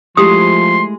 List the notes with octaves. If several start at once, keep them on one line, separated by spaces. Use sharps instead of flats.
F3 G#3 A3 E4 G4 C6 D#6